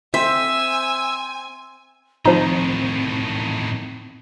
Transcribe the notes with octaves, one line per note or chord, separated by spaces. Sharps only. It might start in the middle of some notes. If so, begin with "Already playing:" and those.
C4 C5 E5 G#5 E6
A2 D#3 F3 C4 D#4